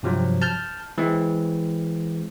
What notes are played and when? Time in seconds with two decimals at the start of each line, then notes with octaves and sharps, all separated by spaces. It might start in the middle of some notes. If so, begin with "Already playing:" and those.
0.03 G2 C3 F3 F#3
0.42 A5 F6 G6
0.98 E3 G#3 C4